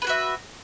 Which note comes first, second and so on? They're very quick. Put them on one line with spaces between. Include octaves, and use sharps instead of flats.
B4 G#4 F#4 E5